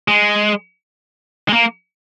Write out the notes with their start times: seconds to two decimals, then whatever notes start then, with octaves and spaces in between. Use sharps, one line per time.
0.08 G#3
1.49 G#3
1.53 A#3